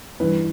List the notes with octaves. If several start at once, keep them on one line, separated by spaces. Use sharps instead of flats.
G2 E3 B4